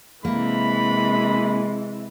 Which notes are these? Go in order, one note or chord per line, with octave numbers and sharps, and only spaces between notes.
C3 E3 G#3 A#3 B5